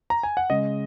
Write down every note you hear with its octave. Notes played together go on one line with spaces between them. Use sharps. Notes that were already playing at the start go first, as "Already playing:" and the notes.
A#5
G#5
F#5
C#3 G#3 D#5